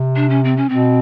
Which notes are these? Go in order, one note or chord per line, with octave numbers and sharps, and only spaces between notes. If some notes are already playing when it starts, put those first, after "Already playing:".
Already playing: C3
D4
C#4
C4
C#4
B2 C4